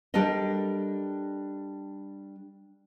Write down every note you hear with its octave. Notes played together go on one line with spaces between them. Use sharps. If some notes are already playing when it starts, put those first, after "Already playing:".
G3 D4 G4 A4 A#4 D#5